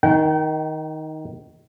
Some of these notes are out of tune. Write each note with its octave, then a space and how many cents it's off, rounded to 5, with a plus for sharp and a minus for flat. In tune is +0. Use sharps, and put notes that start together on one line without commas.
D#3 +10 G5 -35